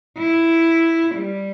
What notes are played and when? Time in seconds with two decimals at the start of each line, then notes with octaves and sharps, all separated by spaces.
0.19 E4
1.15 G3